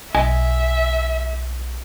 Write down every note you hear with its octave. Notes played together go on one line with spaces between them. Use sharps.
B1 D#5 E5 G#5